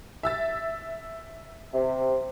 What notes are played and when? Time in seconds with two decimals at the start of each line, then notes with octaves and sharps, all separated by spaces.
0.23 E5 E6 A6
1.73 C3